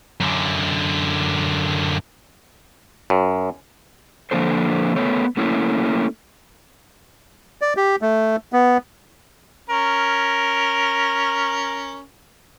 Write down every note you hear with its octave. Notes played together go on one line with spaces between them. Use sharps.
F#2 D3
F#2
D3 F3 A#3 D4 A4 C5
A3 B3 C#5
A3 A#3 C#4 E4
D5
G4
A3
B3
C#4 A#4